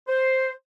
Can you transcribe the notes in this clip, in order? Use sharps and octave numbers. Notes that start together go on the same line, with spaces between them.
C5